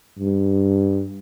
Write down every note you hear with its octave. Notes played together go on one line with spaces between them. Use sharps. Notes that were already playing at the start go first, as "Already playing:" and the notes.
G2